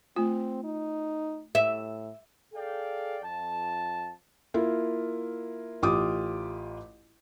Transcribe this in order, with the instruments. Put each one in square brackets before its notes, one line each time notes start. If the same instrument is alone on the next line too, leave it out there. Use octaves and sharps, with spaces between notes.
[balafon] A3 F4 [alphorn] C4
[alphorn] D#4
[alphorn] A2 [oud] E5
[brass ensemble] G#4 A4 D5 F5 G5
F2 A5
[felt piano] A#3 E4 F4
A1 F4 G4 D6 D#6